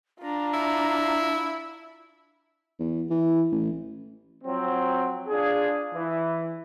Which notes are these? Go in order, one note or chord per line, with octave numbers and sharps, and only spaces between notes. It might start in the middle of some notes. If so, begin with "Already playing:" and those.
D4 F4 A#5
E4
E2
E3
A1
F3 F#3 C4
D4 F4 G#4
E3